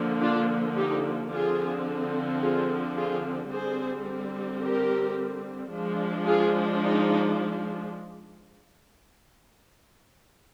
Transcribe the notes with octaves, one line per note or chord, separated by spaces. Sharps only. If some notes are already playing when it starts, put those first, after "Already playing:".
Already playing: D3 F3 A#3
D4 F4
D#4 G4
D3 F3 C4 F4 G#4
F4 G#4
F4 G#4
D3 G3 C4 G#4 C5
G4 A#4
F3 G#3 D4
F4 G#4
D#4